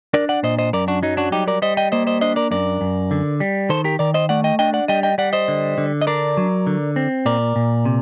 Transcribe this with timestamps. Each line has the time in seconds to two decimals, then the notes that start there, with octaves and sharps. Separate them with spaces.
0.14 D4 A#4 D5
0.29 D5 F#5
0.43 A#2 C5 D#5
0.59 C5 D#5
0.73 F#2 A#4 D5
0.88 D4 F#4
1.03 F#3 D#4
1.17 D4 F#4
1.32 G3 D#4 G4
1.48 A#4 D5
1.62 G3 C5 D#5
1.77 D#5 G5
1.92 A#3 C5 D#5
2.07 C5 D#5
2.21 D4 C5 D#5
2.36 A#4 D5
2.51 F#2 A#4 D5
2.81 F#2
3.11 D3
3.40 G3
3.69 D#3 A4 C5
3.84 G4 A#4
3.99 D#3 A#4 D5
4.14 C5 D#5
4.29 A3 D5 F#5
4.44 D#5 G5
4.59 D4 D#5 G5
4.74 D5 F#5
4.88 G3 D#5 G5
5.03 D#5 G5
5.18 G3 D5 F#5
5.33 C5 D#5
5.48 D3
5.78 D3
6.02 D#5
6.07 D4 A#4 D5
6.37 F#3
6.67 D3
6.96 C4
7.26 A#2 A#4 D5
7.56 A#2
7.85 C3